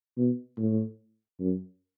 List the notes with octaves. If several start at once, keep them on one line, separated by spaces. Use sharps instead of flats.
B2
A2
F#2